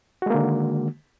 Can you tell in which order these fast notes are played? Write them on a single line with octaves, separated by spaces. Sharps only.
F#4 G#3 A#3 D3 D#3